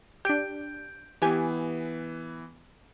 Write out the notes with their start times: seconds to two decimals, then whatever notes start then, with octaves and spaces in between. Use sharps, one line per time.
0.25 D4 G4 G6 D7
1.22 E3 B3 G4 G#5